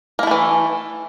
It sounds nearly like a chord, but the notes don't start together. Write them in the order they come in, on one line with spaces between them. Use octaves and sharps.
A#3 E4 A3 E3